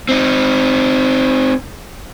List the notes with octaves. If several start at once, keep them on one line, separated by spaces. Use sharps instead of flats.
C4 D#4